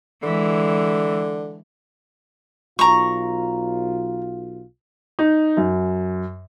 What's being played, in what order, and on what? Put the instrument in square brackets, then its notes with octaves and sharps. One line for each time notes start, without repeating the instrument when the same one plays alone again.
[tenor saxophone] D3 [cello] E3 G#3
[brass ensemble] B1 F4 [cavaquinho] A#5 C#6
[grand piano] D#4
F#2